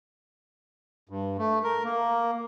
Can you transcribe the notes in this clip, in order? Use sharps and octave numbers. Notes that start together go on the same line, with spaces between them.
G2
A3
A#4
A#3